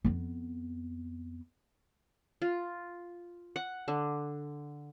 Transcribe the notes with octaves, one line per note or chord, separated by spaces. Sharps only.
F2 B3
F4
F#5
D3